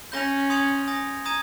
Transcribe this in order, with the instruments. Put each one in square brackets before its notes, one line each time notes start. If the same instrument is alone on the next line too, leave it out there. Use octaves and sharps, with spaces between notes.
[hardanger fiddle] C#4 [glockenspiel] G6 A#6 F7
[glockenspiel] C6 D#6 G#6 C#7 F7
G#5 D#6 A#6
A#5 D#6 G#6 D#7